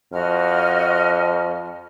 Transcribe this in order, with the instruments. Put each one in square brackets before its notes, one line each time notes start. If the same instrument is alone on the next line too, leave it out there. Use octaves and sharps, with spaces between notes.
[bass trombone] F2 [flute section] F#4 D#5 F6